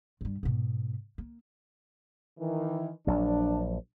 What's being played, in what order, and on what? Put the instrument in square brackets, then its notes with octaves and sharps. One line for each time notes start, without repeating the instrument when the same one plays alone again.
[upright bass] G2 G3
G#2 B2
A#3
[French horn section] D#3 E3
[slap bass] A#1 F#3 [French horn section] D4